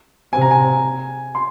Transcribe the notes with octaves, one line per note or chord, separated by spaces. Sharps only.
C3 G#5
A#5
G#5
C6